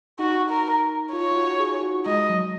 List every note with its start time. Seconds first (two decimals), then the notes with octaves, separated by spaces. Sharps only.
0.19 D#4 F#4
0.50 A#4
1.13 F4 C#5
1.32 F4
1.35 F#4
1.59 G#4
1.83 F#4
2.06 G#3 D#5
2.29 F#3